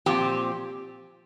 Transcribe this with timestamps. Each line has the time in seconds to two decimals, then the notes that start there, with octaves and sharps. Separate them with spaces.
0.06 A#2 F3 C4 G4